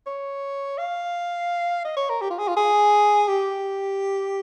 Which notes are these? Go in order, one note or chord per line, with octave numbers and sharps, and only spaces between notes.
C#5
F5
D#5
C#5
A#4
G4
F4
G#4
F4
G#4
G4